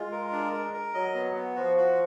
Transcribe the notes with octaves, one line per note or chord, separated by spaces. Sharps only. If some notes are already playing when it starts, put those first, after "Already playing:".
Already playing: G#3 F4
A#4
D4
A#4
A#4
F#3 D#5
B3
B3
F3 F#4
F#4